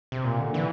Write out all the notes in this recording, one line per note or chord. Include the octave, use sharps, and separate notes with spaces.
C3
A#2
D3
E3